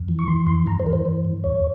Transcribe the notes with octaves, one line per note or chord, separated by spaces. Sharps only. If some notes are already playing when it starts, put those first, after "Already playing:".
Already playing: F2
E3
C#6
E3 C6
F2 C6
G2 A#5
C5
E3 A#4
C5
E3
G2
E2 C#5